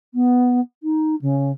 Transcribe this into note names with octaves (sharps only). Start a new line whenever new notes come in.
B3
D#4
C#3